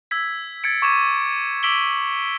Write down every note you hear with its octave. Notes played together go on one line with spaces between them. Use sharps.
E6 G#6 B6
G#6 A6 C#7 D7
C#6 D6 G#6 E7
D6 E6 B6 D7 F#7 G7